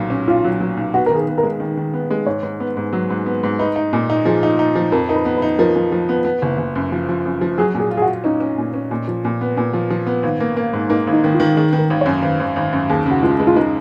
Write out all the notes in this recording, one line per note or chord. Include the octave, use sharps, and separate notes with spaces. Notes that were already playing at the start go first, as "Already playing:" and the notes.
Already playing: B1 A#2 F#3
C#4
B1 F4
F#3
F#3
B1
B3 F#4
D#3 A#4
G#4
B3
A#4
G#3
D#3
D#3
B3
G#3
G#2 C#5
G#2
B3
G#2
F#3
G#2
B3
G#2
D#4 B4
D#4
A#2
D#4
F3 G#4
D#4
D#4
F3
F2 A#4
D#4 A#4
B4
B3
B4
D#4
F3 A#4
F3
F3
B3
B3
F#1
F#1
F#2
F3
F3
F#2
F3
F#3 G#4
A#2
G#4
F4
G#4
F#4
F4
C#4 D#4
C#4
A#2
C#4
A#2
F3
A#2
B3
A#2
F3
F3
B3
G#1
A#3
A#3
G#2
A#3 D#4
G#1
D#4
D#3
F4
D#3
D#3 G#4
D#3 B4
A#4
G#1
C#5
F#2
G#1 B4
G#1
G#1
F#2
D#2 G#4
C#3 F#4
G#3 F4
G#3
F4
G#3 D#4